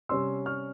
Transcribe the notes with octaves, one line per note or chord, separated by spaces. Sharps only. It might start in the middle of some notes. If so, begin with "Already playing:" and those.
C3 G3 C#4 C6 E6
C#6 F6